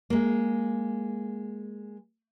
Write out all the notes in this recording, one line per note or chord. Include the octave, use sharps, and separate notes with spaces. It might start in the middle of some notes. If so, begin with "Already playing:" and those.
G#3 A#3